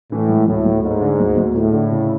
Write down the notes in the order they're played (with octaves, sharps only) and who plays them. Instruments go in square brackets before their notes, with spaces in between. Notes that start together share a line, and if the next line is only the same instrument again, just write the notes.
[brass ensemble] A2 [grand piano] E3
[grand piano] G#2
[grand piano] D2 [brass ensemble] A2
[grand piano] D2
[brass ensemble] G#2 [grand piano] A3
[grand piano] D3
D2
D2
[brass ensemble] A2 [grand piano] A3
[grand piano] D3
C#3